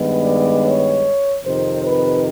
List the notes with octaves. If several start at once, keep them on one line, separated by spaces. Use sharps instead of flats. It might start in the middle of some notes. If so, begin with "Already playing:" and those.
Already playing: G2 D#3 G#3 B3
D5
C#5
F2 C3 D#3 C5
B4